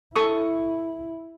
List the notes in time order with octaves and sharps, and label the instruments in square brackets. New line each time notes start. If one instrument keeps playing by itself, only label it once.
[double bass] E4 [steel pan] A4 C#6 D#6